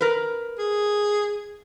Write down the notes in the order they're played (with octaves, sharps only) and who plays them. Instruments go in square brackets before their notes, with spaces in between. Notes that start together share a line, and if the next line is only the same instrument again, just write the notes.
[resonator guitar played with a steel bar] A#4 B4
[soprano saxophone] G#4